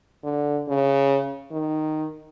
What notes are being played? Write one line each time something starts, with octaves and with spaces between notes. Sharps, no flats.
D3
C#3
D#3